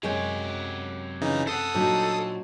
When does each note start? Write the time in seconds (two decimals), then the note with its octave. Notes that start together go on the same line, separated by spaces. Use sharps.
0.03 F#2 C3 F#3 G#3 C#4 G4 C#5 G5
1.21 C#3 E3 D#4
1.47 A4 C5 F#5 D#6
1.75 A#2 F#3 D4 D#4